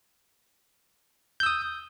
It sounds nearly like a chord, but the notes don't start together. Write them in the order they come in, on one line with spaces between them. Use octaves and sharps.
G6 E6 D#6